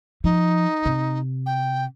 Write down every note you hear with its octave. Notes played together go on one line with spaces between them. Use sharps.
F3 D#4
C3
G5